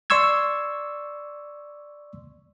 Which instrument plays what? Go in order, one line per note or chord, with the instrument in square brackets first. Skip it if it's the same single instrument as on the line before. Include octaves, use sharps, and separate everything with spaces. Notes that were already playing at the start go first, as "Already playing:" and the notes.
[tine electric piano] D5 C6 C#6 E6 G#6